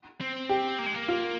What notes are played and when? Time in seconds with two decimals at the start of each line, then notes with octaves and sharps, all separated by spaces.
0.21 C4
0.49 G4
0.79 A#3
0.86 G#3
0.94 A#3
1.08 F4